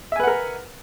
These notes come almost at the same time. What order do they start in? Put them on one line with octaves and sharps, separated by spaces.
E5 G#5 B4 F#5 A#4